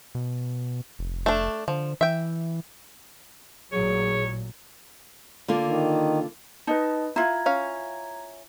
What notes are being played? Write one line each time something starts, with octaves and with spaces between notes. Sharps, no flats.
B2
F1
A3 D4
D3 F3
E3 E5 G5
A1 A#2 F#3 G#4 C#5
D3 A#3 F4
D#3
D#4 B4 D#5 A5
E4 F4 A#5 G#6
C#4 F5